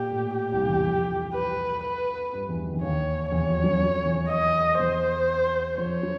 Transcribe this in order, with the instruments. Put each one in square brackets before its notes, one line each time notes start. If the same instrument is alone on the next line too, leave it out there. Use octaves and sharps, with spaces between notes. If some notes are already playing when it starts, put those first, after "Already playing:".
Already playing: [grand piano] A#2 [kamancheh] G4
[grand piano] A2
[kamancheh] G4
[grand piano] C2 C3
E2 E3
F2 F3
[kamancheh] B4
B4
[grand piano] G2 G3
E2 E3
D#3
E3
[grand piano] D#2 D#3 [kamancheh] C#5
[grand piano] E2 E3 [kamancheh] C#5
[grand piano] F2 F3
F#2 F#3
F2 F3
E2 E3
[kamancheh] D#5
[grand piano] E2 E3 [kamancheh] C5
[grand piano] F2 F3 [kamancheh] C#5
[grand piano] F#3